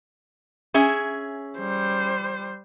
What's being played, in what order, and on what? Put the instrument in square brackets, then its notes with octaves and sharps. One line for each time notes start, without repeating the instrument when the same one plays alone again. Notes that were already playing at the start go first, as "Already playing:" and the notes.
[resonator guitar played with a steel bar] C#4 G#4 E5
[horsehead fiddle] G3 C5